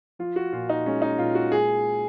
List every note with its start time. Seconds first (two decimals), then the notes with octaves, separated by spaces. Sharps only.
0.19 F3 F4
0.36 F#4
0.52 A#2 F4
0.69 D#4
0.86 G#3 C#4
1.02 D#4
1.18 A#2 F4
1.35 F#4
1.52 G#3 G#4